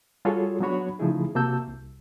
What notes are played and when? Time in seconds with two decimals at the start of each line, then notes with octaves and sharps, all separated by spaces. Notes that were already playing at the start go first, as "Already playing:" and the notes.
0.25 G3 F4 F#4 G#4 A4 C#5
0.60 F#3 B3 D4 F#4 C#5 B5
0.99 C#3 F3 A3 D#4 E4 G#4
1.35 C3 A#3 F#4 A5 E6 G6
1.68 C2